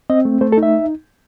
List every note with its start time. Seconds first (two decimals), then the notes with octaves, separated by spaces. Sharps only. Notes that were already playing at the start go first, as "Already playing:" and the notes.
0.10 C4 D#5
0.25 A3
0.41 A3 C5
0.52 A4
0.58 D#4
0.63 E5